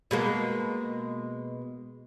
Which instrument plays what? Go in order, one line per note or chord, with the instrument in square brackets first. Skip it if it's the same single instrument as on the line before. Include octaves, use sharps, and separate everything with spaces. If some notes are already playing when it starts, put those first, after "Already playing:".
[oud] B2 G#3 A#3